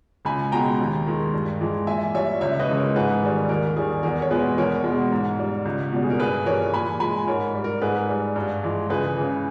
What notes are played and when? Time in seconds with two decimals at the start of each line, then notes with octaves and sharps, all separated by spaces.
0.25 C#2 G#5 B5
0.52 B2 G#3 G5 A#5
0.80 D#2
1.06 D#3 G#3
1.34 G2
1.61 E3 G#3
1.87 A#2 E5 G#5
2.15 G3 C#5 E5
2.41 C#2 C#5 E5
2.60 B4 D#5
2.68 C#3 E3 G#3
2.77 A#4 C#5
2.96 G#2 G#4 B4
3.22 D#3 G3
3.49 D#2 A#4
3.76 D#3 G3 G#4
4.03 E2 A#4
4.22 C#5
4.30 B2 G#3 G#4 B4
4.58 E2 A#4 C#5
4.84 B2 G#3
5.11 G#2
5.39 G3
5.65 C#2
5.92 B2 G3
6.03 G#4
6.10 A#4
6.19 G2 G#4 B4
6.46 E3 G3 A#4 C#5
6.74 A#2 G#5 B5
7.00 G#3 G#5 B5
7.27 G#2 A#4 C#5
7.55 G3
7.64 A#4
7.82 G#2 G#4 B4
8.09 G3
8.36 G2
8.63 E3 G#3
8.89 C#2 G#4 B4
9.17 C#3 E3